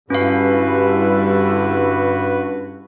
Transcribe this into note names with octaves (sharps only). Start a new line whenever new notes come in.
G2 D3 G3 C#4 E4 F#4 B4 F5